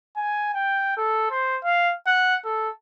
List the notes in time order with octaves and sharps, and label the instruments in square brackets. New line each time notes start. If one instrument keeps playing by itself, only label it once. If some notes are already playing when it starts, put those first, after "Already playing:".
[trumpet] G#5
G5
A4
C5
F5
F#5
A4